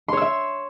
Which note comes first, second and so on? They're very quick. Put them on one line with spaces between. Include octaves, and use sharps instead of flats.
C6 C#5 E6 E5